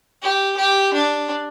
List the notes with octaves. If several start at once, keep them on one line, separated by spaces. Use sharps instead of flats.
G4
G4
D4